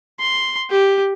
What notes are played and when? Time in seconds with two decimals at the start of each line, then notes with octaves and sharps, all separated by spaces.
0.20 C6
0.70 G4